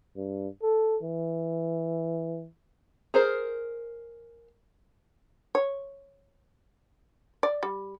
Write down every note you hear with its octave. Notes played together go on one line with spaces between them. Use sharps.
G2
A4
E3
G#4 A#4 C5
C#5
D5
G3